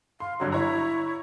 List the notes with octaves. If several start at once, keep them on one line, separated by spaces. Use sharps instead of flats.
F5 C6
G2 D3 F#3 C#5
E4 C#5 A#5